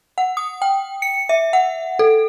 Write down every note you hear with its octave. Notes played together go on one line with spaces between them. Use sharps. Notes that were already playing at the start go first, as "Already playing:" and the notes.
F#5
D#6
G5
C#7
E5
F#5
A4